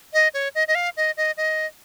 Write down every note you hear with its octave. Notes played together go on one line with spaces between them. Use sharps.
D#5
C#5
D#5
D#5
F5
D#5
D#5
D#5